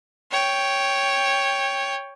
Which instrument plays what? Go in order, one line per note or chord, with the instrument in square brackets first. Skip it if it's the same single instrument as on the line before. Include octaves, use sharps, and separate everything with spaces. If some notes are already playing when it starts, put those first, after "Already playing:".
[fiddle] C#5 G5